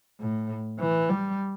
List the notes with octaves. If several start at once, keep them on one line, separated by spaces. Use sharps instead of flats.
A2
E3
G3